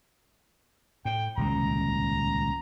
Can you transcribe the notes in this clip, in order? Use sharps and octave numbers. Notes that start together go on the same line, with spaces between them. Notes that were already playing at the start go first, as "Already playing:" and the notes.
A2 G5
D#1 C#2 C3 A#5